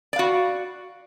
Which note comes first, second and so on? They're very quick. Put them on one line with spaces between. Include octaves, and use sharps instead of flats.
D5 F5 F#4